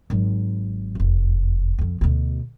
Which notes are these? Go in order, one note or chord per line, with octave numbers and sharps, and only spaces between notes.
G#1 F#3
F1 E2
F2 C3
D2 B2